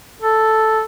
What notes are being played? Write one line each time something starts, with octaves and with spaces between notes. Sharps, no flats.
A4